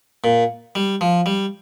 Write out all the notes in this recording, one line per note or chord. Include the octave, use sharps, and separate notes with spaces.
A#2
G3
F3
G3